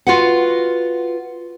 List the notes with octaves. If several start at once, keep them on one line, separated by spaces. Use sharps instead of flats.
F4 F#4 B4 F#5